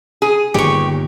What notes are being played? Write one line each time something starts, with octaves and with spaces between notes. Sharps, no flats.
G#4
G1 A#2 D#3 G4 C#6